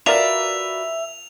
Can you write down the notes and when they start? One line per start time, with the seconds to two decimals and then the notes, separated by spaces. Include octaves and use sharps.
0.06 F4 F#4 A#4 B4 D5 E5 F7